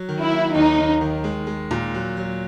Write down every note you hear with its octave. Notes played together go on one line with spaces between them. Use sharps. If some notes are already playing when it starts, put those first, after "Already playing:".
Already playing: F#3
D#3
E4
A#3
D#2 D#4
D#2
D#3
G#3
G#3
A#2
F#3
F#3